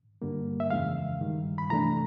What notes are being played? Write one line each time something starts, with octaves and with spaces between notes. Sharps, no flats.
G2 D3 G3 A#3
E5
F2 C#3 E3 G#3 F5
G2 D#3 G3
B5
C3 E3 A3 D4 A#5